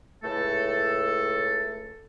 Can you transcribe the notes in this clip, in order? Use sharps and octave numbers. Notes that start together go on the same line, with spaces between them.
C#2 A2 A3 A4